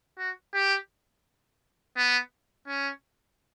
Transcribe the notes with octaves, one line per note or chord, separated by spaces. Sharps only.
F#4
G4
B3
C#4